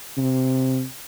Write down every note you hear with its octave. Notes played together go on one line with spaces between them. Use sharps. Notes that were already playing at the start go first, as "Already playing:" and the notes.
C3